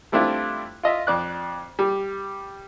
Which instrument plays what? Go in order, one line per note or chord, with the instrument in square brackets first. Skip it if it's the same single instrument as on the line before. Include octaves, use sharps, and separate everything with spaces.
[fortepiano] G3 A3 C4 D4 E4 F4
F4 D#5 E5
F2 D5 F#6
G3